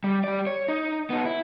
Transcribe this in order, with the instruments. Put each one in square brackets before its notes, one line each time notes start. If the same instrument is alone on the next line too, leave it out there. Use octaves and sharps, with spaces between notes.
[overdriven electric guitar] G3
G3 D5
C#5
D#4
B3 D#4
E4